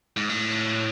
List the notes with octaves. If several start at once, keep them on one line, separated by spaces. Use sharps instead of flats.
G#2
A2